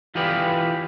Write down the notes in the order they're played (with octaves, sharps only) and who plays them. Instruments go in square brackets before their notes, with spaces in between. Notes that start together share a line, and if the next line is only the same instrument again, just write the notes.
[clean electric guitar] E3 F4 G4 G#4 B4 D5